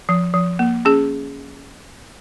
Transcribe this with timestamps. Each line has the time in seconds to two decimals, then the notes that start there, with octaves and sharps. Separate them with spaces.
0.09 F3
0.34 F3
0.59 A#3
0.85 C#4 G#4